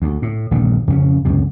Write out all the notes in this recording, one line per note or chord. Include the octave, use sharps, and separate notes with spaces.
D2
A2
D#1 A#1 G2 D3
F2 C#3 A#3 C#4
C#2 F#2 C3